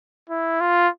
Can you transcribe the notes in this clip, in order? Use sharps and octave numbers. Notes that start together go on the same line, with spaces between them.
E4
F4